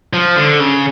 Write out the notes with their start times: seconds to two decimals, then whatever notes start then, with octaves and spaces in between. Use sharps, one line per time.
0.13 F3
0.36 D3
0.60 C#3